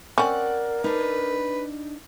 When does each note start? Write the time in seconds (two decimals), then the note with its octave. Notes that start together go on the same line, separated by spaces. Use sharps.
0.18 C4 C#4 A#4 D5 F#5
0.84 D4 D#4 B4